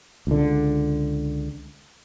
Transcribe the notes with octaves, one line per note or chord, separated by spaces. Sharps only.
C#2 D3